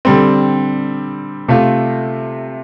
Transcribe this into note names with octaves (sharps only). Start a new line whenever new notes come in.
D3 G3 C4
C3 A3 F4